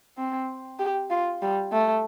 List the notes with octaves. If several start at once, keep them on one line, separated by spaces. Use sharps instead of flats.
C4
G4
F4
G3
A3